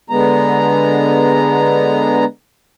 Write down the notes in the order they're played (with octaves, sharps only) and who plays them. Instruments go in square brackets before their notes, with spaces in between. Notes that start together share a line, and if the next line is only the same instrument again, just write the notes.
[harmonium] D3 G#3 B3 A#5